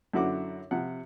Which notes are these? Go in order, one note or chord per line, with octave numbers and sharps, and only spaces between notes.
F#2 D3 E4 F#4 F#5 D6
C3 F3 F#5